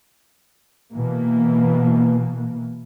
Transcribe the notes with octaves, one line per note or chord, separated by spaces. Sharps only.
B2 E3 A#3